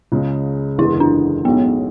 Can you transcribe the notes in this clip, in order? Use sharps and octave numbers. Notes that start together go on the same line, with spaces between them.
C#2 C#3 G#3
F#1 E2 D3 G#3 B3 E4
D4
B1 A2 G#3 B3 C#4 F#4